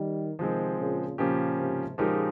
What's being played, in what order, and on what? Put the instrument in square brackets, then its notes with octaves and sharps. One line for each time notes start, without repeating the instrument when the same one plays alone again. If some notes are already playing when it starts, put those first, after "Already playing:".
Already playing: [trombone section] D#3 G3
[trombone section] C3 D#3 [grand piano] F3 G#3 C4
[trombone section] A#2 C#3
[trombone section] A#2 [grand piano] C#3 F3 A#3 C#4 G4
[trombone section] G#2 C3
[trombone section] A#2 C#3 [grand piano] F3 G#3 D#4 G4 A#4